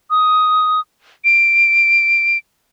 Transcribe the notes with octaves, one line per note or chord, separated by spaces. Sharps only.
D#6
D7